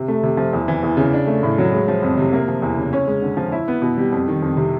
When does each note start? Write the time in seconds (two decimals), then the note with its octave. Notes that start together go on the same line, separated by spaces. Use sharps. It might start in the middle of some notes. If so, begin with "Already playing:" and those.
Already playing: C3
0.08 A3
0.23 C3
0.37 F3
0.53 E2
0.68 E3
0.83 E2
0.97 C#3
1.13 D4
1.27 A3
1.43 A2
1.58 F#3
1.73 G#3
1.88 F3
2.03 F2
2.17 C3
2.33 A#3
2.48 F3
2.62 E2
2.77 C#3
2.93 C#4
3.07 G#3
3.22 D3
3.37 F3
3.52 E4
3.68 B3
3.82 B2
3.98 G3
4.12 F2
4.28 D#3
4.42 F2
4.57 C3